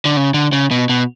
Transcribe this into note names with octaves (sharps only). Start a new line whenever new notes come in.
D3
C#3
D3
C#3
B2
B2